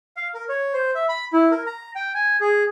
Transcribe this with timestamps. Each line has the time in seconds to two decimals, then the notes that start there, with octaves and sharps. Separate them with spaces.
0.17 F5
0.34 A#4
0.49 C#5
0.73 C5
0.95 E5
1.09 B5
1.33 E4
1.51 A#4
1.66 A#5
1.95 G5
2.14 G#5
2.41 G#4